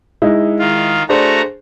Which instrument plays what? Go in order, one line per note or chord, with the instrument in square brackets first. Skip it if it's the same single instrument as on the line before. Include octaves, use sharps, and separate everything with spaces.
[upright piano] G#3 D#4 E4
[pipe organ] D#3 F4
[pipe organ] A3 F#4 A#5 [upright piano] D4 G#4 C5